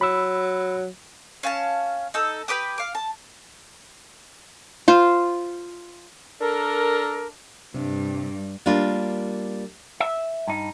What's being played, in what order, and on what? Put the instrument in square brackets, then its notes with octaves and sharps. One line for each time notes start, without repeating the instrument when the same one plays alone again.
[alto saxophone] F#3 [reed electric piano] B5 E6
[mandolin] C#4 F5 G#5 A5
D#4 A4 E6
G4 B4 D6 D#6
F5 D6
A5
[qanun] F4 C5
[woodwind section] D4 A4 A#4
[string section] G2 [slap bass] C3
[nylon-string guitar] G3 A#3 D4 F4
[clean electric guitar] E5
G2 D#4